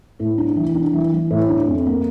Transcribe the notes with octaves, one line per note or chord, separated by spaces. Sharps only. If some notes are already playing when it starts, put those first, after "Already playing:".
A2
D4
E3
D4
E3
E3
A2
D4
F2
A#3